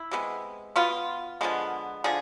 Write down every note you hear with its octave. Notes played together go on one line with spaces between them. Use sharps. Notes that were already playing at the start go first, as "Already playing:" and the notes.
Already playing: E4
C3 G#3 B3
B2 B3 F4
D3 F3 G#3 B3
D3 F3 G#4